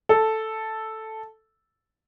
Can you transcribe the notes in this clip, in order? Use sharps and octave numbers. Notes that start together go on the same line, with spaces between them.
A4